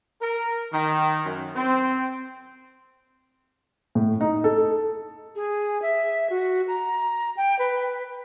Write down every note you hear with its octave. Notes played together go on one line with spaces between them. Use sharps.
A#4
D#3
F#2
C4
A2
D#4
A4
G#4
E5
F#4
A#5
G5
B4